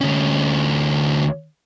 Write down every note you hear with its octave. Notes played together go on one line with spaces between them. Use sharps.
D2 C#4